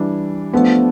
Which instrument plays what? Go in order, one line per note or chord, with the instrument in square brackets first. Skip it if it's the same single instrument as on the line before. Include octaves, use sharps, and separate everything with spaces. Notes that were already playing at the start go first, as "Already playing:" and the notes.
Already playing: [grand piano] E3 G3 D4
[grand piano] F3 A3 D4 [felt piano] B3